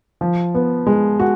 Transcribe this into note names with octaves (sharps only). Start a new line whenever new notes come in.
F3
B3
G#3
F#4